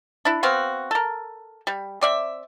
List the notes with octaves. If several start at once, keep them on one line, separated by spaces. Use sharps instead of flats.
D4 E4
B3 C4 F#4 F5
A4 A#4
G3
C4 D5 E5